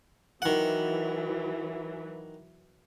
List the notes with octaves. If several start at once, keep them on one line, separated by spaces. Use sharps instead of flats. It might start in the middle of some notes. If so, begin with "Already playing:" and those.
D#3 E3 F#3 F#5